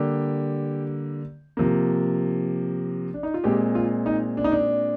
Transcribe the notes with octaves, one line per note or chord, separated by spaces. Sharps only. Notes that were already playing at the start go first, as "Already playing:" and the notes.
Already playing: D3 G3 A#3 G4
C3 F3 A#3
D4
D#4
F4
A#2 G#3 C4 G4
F4
D#4
D4
D#4
D4